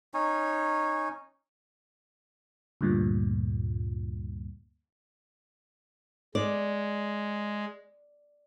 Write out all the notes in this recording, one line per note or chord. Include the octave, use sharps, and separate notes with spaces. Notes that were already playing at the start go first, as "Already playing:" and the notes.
C#4 D#4 C#5 G#5
D2 G2 A#2
G#3 D5